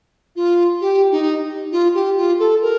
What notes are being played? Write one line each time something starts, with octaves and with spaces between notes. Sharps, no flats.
F4
G4
D#4
F4
G4
F4
A4
A#4